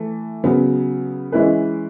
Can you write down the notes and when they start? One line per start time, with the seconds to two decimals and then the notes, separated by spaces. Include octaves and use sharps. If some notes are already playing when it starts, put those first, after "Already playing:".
Already playing: E3 A3
0.44 C#3 F#3 B3
1.32 E3 G#3 C#4 E4 B4